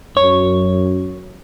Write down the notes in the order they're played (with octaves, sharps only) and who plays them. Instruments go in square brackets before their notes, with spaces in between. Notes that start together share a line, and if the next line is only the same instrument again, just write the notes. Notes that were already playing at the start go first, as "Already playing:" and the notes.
[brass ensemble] F#2 [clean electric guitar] C#5